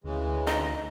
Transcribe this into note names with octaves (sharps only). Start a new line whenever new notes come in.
D2 C#3 E3 G#3
D#4 D#5